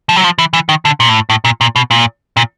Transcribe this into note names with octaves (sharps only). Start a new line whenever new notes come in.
F3
F#3
F3
E3
E3
D#3
D3
A#2
A2
A2
A#2
A#2
B2
A#2
A#2